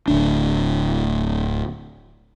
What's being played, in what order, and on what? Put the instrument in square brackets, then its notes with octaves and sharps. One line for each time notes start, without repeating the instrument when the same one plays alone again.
[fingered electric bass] D1 D2 D4